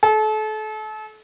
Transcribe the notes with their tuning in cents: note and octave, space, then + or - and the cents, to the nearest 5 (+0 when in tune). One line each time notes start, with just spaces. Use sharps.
A4 -35